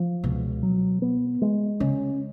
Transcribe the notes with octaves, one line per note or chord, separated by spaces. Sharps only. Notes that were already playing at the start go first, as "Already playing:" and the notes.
Already playing: F3
C#2 B2
F#3
B3
G#3
C#3 C#4